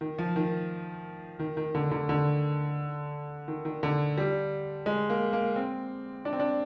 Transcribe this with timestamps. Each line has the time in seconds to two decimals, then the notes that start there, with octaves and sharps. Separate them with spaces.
0.01 D#3
0.18 F3
0.36 D#3
1.39 D#3
1.57 D#3
1.75 D3
1.91 D3
2.09 D3
3.48 D#3
3.65 D#3
3.83 D3
4.18 G3
4.86 G#3
5.10 A#3
5.33 A#3
5.56 C4
6.25 D4
6.33 C4
6.40 D4